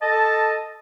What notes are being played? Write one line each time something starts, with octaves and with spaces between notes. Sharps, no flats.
A4 D#5 A5